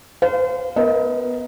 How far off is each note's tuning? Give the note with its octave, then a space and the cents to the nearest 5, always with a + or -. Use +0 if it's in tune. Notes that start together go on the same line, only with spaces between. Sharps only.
C5 -40 F5 +0
B3 +0 A#4 +0 D#5 +35